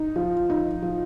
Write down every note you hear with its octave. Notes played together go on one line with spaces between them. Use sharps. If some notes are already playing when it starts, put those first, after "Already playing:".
Already playing: D#4
F3
D#4
F3